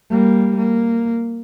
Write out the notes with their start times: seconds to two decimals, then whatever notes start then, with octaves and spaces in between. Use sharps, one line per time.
0.10 G3 A#3
0.57 A#3